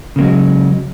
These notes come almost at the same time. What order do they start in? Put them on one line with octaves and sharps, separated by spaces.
C#3 A#3 F#3 G#3